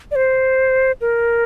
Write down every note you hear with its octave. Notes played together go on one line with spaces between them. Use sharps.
D5
C5
A#4